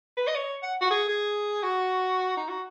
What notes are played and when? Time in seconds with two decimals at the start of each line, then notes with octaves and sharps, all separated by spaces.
0.17 B4
0.27 D#5
0.35 C#5
0.63 F#5
0.81 F#4
0.90 G#4
1.08 G#4
1.63 F#4
2.37 D#4
2.49 F#4